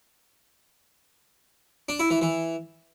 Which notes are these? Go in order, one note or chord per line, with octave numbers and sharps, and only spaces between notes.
D4
E4
E3
E3